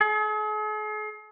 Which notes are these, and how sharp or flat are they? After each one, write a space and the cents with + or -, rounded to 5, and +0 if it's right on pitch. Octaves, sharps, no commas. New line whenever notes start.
G#4 +45